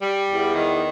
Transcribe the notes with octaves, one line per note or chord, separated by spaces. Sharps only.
G3
E2
D#3